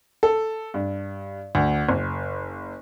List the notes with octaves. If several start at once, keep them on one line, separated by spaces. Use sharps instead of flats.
A4
G2
D2
F#1